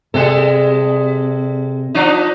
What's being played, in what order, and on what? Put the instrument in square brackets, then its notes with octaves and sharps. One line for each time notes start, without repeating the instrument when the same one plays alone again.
[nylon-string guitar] C3 [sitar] G3 G#3 A4
[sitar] F3 D4 D#4